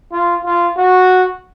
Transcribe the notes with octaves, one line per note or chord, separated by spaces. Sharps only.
F4
F4
F#4